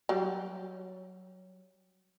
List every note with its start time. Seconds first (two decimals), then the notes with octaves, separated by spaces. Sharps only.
0.09 F#3 G3